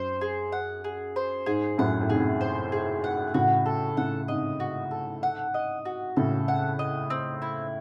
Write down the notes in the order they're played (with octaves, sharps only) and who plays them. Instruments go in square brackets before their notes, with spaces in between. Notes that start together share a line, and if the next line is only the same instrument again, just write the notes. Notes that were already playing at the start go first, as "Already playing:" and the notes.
Already playing: [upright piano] F#2 [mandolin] C5
[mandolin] G#4
F#5
G#4
C5
[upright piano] G#2 [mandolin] G#4
[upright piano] F#2 A2 [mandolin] F#5
[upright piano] A2
[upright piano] G#2 C3 [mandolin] G#4
[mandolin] C5
G#4
F#5
[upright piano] A2 C#3 [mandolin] F#4
[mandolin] A4
[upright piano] A2 C#3 [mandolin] F#5
[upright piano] G#2 C3 [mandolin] D#5
[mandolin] F#4
A4
F#5
D#5
F#4
[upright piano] A2 C#3 [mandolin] A4
[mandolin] F#5
D#5
C4
E4